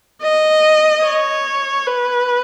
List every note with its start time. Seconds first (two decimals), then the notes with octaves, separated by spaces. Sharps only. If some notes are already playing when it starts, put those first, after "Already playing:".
0.22 D#5
1.04 C#5
1.87 B4